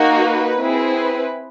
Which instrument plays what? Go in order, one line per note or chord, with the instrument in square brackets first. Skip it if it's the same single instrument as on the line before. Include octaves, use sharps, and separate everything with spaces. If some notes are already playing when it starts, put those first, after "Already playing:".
Already playing: [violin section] A#3 D#4 F#4
B4
C4 E4 G#4
B4